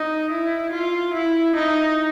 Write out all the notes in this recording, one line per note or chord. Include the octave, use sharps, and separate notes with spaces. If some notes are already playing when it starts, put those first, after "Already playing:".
Already playing: D#4
E4
F4
E4
D#4